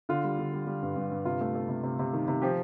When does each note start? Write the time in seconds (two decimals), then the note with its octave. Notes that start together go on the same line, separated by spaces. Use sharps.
0.09 D3 F4
0.24 G3
0.39 D3
0.53 G3
0.67 G3
0.83 G2
0.96 G2
1.11 G2
1.25 C3 F4
1.41 A3
1.55 A3
1.69 C3
1.83 C3
1.99 C3
2.13 D#3
2.28 C3
2.42 F3 G4